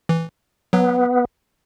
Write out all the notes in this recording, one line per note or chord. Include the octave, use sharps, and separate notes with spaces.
E3
F#3 B3